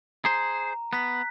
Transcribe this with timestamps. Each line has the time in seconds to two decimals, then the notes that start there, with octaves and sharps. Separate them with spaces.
0.25 G#4 C5 A#5
0.93 B3 F#6 B6